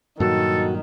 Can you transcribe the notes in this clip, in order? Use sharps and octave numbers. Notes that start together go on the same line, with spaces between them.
G2 A#2 D#3 F#3 F#4 A4